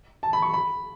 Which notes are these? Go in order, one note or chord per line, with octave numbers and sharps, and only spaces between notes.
A5
B5
C#6
B5